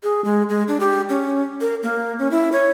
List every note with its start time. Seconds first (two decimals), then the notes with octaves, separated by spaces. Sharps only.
0.03 G#4
0.25 G#3
0.49 G#3
0.68 D4
0.80 G4
1.09 C#4
1.61 A#4
1.83 A#3
2.19 C#4
2.31 E4
2.52 C#5